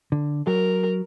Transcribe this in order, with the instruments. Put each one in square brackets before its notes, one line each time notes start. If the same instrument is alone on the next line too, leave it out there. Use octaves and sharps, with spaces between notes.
[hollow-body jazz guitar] D3
[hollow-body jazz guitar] F#3 [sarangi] A#4